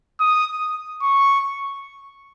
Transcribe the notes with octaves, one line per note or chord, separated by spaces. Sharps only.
D#6
C#6